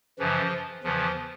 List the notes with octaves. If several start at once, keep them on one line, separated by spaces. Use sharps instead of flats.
F#2 C#3 E3 F3
E2 C#3 E3 F3